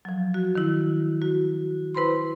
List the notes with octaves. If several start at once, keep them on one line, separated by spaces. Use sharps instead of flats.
F3 F#3
F#4
D#3 E4
F#4
E4 B4 C5 B5 C6